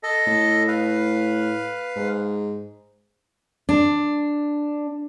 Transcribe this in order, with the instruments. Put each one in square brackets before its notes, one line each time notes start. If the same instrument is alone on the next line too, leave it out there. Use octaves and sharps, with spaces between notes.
[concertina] A4 D#5
[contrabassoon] A2
[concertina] B4 F5
[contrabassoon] G#2
[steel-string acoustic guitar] D4